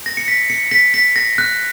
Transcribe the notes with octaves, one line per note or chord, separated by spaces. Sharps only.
A#6
C#7
B6
C#7
B6
B6
A#6
F#6